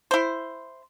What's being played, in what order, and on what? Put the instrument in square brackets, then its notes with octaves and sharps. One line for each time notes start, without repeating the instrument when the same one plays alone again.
[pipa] E4 C5